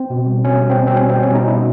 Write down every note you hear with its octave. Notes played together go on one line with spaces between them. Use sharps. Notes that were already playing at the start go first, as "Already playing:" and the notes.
Already playing: C4
B2
G3
B2 C#4
G3
C4
B2
C4
G3 C#4
B2 C4
C#4
G3 D#4
B2 E4